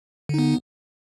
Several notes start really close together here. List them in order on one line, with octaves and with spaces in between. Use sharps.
D3 D#4 B3